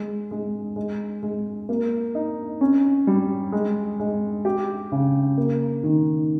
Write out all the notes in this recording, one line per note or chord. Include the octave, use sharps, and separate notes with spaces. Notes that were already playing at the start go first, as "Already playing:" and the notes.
Already playing: G#3
G#3
G#3
G#3
A#3
D#4
C#4
G3
G#3
G#3
G4
C#3
A#3
D#3